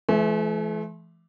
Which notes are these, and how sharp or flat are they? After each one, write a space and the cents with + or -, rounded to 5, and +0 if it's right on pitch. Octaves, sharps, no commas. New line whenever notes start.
E3 +30 A3 -40 E5 +0